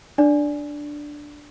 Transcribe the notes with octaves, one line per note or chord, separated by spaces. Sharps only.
D4 D5